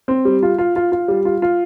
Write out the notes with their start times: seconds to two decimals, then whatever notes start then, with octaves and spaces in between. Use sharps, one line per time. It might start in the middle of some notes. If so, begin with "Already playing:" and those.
0.08 C4
0.25 G3
0.43 F4
0.58 F4
0.76 F4
0.92 F4
1.08 G3
1.25 F4
1.42 F4